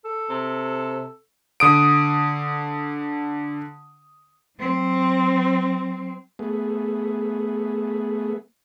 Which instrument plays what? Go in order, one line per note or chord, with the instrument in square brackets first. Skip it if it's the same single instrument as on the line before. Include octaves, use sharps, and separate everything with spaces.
[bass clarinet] A4
[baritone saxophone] C3
[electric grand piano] D3 D#6 D7
[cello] F#3 C4
[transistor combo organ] A3 B3 G#4